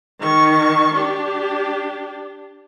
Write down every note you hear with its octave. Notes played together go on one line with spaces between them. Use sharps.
D#3 C#6
D4 G4